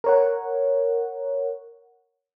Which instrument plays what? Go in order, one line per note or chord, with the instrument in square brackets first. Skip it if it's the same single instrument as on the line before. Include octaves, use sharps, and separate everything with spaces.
[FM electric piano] A#4 C#5 F#5